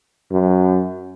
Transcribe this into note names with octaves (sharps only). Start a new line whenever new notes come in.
F#2